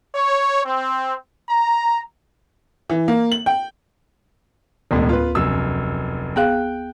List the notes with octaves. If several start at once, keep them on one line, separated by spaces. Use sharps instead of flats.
C#5
C4
A#5
E3
A#3
F#7
G5
E1 D2 A2 G#3 B3
F4 B4
F1 F#2 E6
B3 G#4 F5 G5 F#6